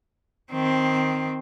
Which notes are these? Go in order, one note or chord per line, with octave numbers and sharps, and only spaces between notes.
D#3 C4